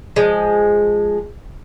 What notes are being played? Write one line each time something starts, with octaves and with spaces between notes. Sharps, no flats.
F3 G#3